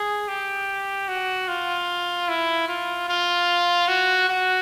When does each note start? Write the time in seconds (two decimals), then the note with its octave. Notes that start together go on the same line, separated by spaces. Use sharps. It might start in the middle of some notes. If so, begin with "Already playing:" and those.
Already playing: G#4
0.28 G4
1.08 F#4
1.48 F4
2.28 E4
2.68 F4
3.09 F4
3.88 F#4
4.29 F#4